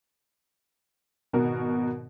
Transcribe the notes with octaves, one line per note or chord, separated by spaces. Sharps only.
G#1 B2 F#4 A#4